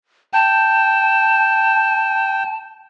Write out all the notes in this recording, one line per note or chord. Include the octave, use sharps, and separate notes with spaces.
G5 A5